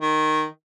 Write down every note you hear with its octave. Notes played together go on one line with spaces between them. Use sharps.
D#3